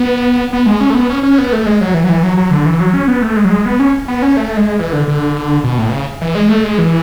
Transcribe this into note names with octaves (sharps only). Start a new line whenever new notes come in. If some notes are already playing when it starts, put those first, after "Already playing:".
Already playing: B3
B3
G#3
C#4
A3
B3
C#4
C#4
B3
A3
G#3
F#3
E3
F#3
E3
F#3
F#3
D3
E3
F#3
C#4
B3
A3
G#3
F#3
G#3
B3
C#4
B3
C#4
A3
G#3
E3
D3
D3
B2
A2
B2
C#3
E3
G#3
A3
G#3
E3